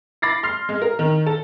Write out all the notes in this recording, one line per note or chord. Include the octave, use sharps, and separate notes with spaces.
B5 D6 A6 A#6 C7
C6 F6 C7
G#3
A#4
D#3
A4